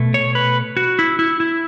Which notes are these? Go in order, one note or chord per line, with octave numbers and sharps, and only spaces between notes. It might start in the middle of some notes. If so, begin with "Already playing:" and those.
Already playing: B2 A3
C#5
B4
F#4
E4
E4
E4